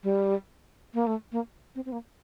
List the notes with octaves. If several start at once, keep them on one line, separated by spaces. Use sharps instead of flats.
G3
A#3
A3
A#3
C4
C4
A#3